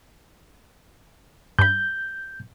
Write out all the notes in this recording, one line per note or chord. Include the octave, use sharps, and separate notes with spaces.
G2 B5 G6